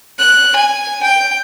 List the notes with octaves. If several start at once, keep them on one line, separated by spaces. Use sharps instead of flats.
F#6
G#5
G5